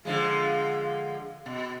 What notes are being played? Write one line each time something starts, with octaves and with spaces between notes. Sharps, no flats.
D3 F3 G#3 F5
B2